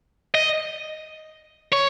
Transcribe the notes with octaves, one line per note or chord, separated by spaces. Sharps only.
D#5
C#5